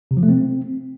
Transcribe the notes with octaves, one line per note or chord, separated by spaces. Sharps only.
C3
F3
A3
C4